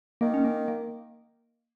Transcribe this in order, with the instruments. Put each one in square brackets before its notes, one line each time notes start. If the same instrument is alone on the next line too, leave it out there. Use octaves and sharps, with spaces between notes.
[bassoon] D#3 [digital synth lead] A#3
[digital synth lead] C#4
A#3
A#3